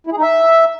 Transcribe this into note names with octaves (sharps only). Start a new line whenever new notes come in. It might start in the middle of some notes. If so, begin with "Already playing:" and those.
E4
G#4
D#4
E5